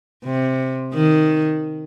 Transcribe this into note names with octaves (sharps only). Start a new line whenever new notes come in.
C3
D#3